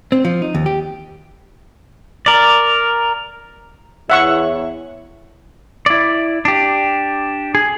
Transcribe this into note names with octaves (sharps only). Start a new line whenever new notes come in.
C4
F3
D#4
D#2
G4
A#4 D5
E2 E4 C#5 E5 F#5 C#6
E4 D5
D4 G4
G#4